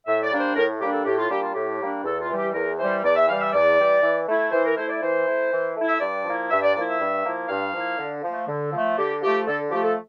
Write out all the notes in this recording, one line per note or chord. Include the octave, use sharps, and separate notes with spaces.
A2 E5
D5
G3 A#3 D4
C5
A2 A#4
G3 A#3 D4 G4
A4
A2 G4
F4
G3 A#3 D4 G4
F4
A2 G4
G3 A#3 D4
E2 A4
F4
E3 G3
G4
E2 A#4
E3 G3 C5
E2 D5
E5
E3 G3 F5
E5
E2 D5
E3 G3
E3
A3 E4
E3 C5
A#4
A3 E4 C5
D5
E3 C5
A3 E4
E3
A3 E4
E5
G2 D5
F3 A#3 E4
G2 E5
D5
F3 A#3 E4 D5
E5
G2
F3 A#3 E4
G2 F5
F3 A#3 E4
D3
F3 A3
D3
F3 A3
D3 G4
F3 A3 G4
D3 A4
F3 A3 G4
A4